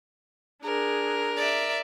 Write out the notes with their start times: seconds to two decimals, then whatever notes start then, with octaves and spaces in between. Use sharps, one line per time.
0.63 D4 G#4 A#4
1.37 D5 E5